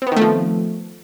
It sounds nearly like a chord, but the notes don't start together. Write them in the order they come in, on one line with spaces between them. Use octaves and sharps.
C4 B3 D#3 A3 F3